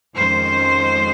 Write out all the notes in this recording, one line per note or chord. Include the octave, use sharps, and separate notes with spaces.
F2 D#3 G#3 C#4 C5